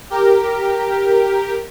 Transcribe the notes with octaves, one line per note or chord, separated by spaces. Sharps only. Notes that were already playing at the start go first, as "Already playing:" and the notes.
G4 A#4